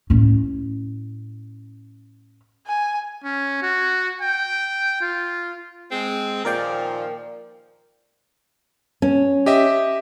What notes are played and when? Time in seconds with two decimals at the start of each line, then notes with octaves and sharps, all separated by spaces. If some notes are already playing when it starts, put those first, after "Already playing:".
0.10 A2 C#4
2.66 G#5
3.24 C#4
3.62 F#4
4.21 G5
5.01 F4
5.92 G#3 C4
6.45 A#2 D#3 F3 A#4 D5 G5
9.02 C#4
9.46 G4 D#5 E5